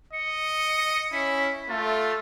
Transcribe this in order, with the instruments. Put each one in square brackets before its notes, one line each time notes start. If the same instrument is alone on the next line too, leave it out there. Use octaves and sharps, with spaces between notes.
[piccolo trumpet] D#5 [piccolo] C#7
[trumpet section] C#4 [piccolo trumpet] E4 [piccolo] B6
[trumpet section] A3 [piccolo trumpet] F4 [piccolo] A6